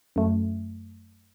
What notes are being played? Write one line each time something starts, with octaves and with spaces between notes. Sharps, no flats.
F#2 A3